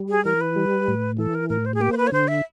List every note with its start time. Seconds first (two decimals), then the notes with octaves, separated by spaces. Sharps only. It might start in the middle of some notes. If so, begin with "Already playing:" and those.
Already playing: G3
0.09 G#4
0.25 E3 A#4
0.41 B4
0.56 G3
0.88 A2
1.18 E3 A4
1.35 A#4
1.49 A2 A#4
1.66 C5
1.74 G#4
1.80 A#3 G4
1.92 C5
1.97 B4
2.07 C#5
2.12 D3 C5
2.28 E5